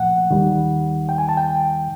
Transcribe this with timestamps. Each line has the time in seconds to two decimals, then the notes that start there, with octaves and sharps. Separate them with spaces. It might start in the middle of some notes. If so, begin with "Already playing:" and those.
Already playing: C2 A#2 F3 A3 F#5
0.31 D#2 D#3 G3
1.09 G5
1.18 G#5
1.29 A5
1.37 G5